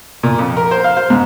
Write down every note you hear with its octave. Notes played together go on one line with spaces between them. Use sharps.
A#2
F2
A#4
C5
F5
C5
G#2